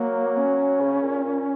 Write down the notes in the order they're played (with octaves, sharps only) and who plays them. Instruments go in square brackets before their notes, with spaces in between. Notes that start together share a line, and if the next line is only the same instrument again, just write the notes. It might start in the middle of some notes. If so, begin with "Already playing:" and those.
Already playing: [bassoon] F#3 [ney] A#3
[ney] C#4
[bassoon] C#3
A#2
A#2